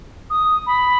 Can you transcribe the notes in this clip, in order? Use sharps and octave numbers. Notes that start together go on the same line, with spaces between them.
D#6
B5